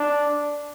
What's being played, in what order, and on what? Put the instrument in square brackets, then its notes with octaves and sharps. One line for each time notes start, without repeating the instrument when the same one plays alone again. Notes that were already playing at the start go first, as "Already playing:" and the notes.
Already playing: [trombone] D4